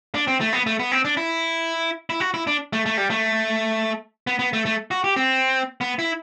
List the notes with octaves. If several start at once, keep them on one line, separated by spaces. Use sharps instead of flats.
D4
C4
A3
B3
A3
B3
C4
D4
E4
E4
F#4
E4
D4
A3
A3
G3
A3
B3
B3
A3
A3
F#4
G4
C4
B3
E4